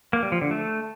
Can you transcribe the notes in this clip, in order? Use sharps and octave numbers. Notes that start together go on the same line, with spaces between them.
A#3
G3
F3
D3
A3